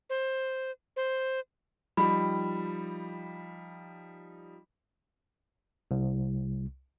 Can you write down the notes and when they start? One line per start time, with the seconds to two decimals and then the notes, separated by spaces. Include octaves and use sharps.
0.10 C5
0.96 C5
1.97 F3 G3 D#4 B5
5.91 C2